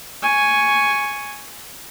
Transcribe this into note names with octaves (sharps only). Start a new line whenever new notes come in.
G#5 C#6